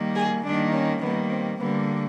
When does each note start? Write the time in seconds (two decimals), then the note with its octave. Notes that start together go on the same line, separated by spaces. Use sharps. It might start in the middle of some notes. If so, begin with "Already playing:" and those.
Already playing: D#3 G3 A#3
0.15 G#4
0.44 D#3 G3 A#3 D4
0.73 C#4
1.02 D#3 G3 A#3 B3
1.31 C4
1.60 D3 G3 A#3 B3